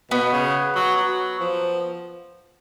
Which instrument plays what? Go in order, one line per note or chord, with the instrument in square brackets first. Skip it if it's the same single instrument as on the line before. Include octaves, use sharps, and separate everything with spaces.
[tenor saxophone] B2 [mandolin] B3
[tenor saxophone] C#3
F#3
F#3
F3